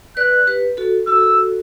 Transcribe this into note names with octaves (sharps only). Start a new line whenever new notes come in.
B4 D5 F#6
G4 B4
F#4 A4
F#4 A4 E6